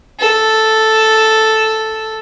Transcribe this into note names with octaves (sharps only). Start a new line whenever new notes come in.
A4